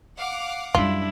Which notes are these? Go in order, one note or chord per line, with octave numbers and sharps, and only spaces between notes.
F5 F#5 D6
F#2 G3 D4 E4 F4